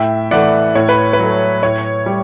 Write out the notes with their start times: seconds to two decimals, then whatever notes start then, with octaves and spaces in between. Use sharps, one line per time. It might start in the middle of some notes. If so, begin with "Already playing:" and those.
Already playing: A2 E5 G5
0.31 E3 A3 D5 F#5
0.75 A2 C#5
0.89 B4
1.13 B4
1.19 F#3 A3
1.63 A2 C#5
2.06 G3